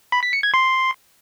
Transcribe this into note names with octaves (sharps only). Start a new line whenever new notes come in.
B5
B6
C#7
G#6
C6